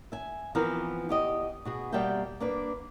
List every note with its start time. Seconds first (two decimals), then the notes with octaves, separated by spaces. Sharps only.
0.12 E5 G#5
0.55 E3 F3 B3 C4 A#4
1.09 E2 G4 D#5
1.65 B2 F#4 G#4
1.92 B2 G3 A#3 E5 F#5 G5
2.40 A#3 D4 B4